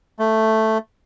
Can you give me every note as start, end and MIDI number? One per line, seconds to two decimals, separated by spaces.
0.19 0.78 57